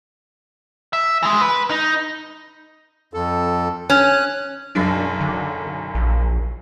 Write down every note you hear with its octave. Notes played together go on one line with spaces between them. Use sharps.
E5
E3 G#3
B4
D#4
F2 A4
C#4 F#6
F#1 B1 F#2 D4
D3
A#1